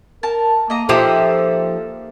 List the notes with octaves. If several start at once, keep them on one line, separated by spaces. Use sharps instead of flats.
A#4 A5
A#3 D#5 A#5
F3 A#3 D#4 G4 A4 E5 D#6